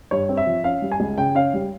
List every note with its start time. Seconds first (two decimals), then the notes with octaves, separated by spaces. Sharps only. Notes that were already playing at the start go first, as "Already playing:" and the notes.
0.11 G2 C#5
0.29 C4
0.37 E5
0.47 F3
0.64 C#4 F5
0.82 G3
0.92 G#5
1.00 C#2
1.17 C#3 G5
1.35 C#4 F5
1.54 G3